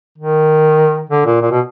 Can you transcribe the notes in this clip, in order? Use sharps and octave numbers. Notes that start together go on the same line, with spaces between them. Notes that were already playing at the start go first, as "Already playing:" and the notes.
D#3
D3
A#2
A#2
B2